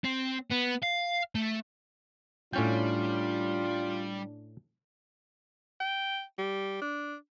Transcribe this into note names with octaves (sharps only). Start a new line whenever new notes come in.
C4
B3
F5
A3
A2 G3 C#4 D4 F4 G5
G5
G3
D4